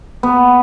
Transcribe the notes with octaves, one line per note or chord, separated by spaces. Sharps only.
B3